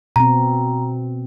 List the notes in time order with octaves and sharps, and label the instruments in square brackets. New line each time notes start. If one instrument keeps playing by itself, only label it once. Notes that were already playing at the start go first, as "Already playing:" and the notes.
[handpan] B2 C4 [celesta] A#5